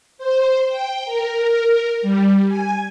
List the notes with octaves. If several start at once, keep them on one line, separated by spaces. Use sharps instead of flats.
C5
G5
A#4
G3
G#5